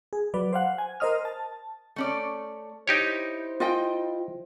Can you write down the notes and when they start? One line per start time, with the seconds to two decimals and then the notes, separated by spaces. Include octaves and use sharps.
0.13 G#4
0.34 F#3 B4 D5
0.53 C5 F5 F#5
0.78 G#5
1.00 A#4 C5 D#5 D#6 F6
1.25 A5
1.96 A3 C#4 D5
2.88 D#4 E4 G4 C5 C#5
3.60 F4 D#5 G5